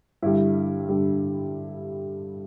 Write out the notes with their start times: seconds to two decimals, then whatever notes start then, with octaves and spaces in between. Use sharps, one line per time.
0.22 G2 D3 G3 E4
0.89 G2 D3 G3